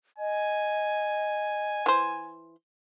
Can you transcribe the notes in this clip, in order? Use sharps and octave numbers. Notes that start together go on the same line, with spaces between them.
D#5 G#5
E3 C5